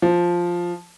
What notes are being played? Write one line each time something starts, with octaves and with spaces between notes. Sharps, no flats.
F3